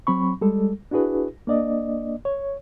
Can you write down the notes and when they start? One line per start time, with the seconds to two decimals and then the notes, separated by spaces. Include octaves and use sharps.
0.07 F#3 C4 B5 C#6
0.41 G3 G#3 A4
0.91 D4 E4 F#4 G#4 B4
1.47 A#3 D4 D5 D#5
2.25 C#5